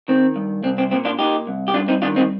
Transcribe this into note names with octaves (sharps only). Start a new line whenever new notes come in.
D#3 C4
G2
C2 C4
C4
A#2 C4
D4 F4
A#2 D#4 G4
C2
G4
G2 D4 F4
C4 D#4
D#3 D4 F4
C4 D#4